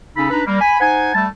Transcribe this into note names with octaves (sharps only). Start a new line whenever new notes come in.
C#3 C#4 D#4 A4 B5
D4 D#4 B4 A#5 B5
G3 A#3
G#5 B5
D#4 C5 F#5 G#5
G3 A3 A5